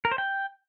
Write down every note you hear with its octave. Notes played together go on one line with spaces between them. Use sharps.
A#4
C5
G5